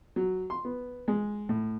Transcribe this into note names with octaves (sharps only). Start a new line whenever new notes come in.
F#3
C6
B3
G#3
A2